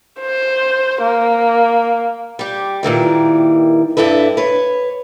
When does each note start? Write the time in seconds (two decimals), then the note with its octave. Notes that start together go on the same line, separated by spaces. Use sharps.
0.20 C5
1.01 A#3
2.39 G3 G4
2.83 A#2 D#3 E3 G3
3.97 G2 D4 E4 A4 B4
4.37 B4 C#5